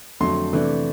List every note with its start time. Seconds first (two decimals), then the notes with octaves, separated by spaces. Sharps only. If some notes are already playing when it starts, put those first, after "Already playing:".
0.20 F2 D3 F#3 A3 C6
0.53 C3 E3 A3 D4